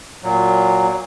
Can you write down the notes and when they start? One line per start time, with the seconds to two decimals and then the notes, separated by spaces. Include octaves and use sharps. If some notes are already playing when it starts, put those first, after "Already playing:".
0.23 A#2 F#3